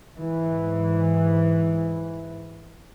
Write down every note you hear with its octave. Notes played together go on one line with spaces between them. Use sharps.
G#2 E3